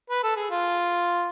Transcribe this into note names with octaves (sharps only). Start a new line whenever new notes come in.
B4
A4
G#4
F4